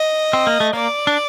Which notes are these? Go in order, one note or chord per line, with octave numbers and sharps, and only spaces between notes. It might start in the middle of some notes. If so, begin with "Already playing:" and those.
Already playing: D#5
C4
A#3
A3
A#3 D5
D4